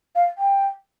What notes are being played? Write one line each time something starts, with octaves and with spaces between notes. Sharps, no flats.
F5
G5